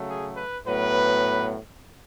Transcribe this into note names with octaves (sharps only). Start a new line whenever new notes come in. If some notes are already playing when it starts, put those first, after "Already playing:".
Already playing: C#3 F#3 A3
G#4
B4
A2 F#3 B3 B4